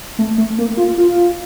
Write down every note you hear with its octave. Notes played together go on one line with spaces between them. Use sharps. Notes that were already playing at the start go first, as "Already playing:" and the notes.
A3
A3
A#3
F4
F4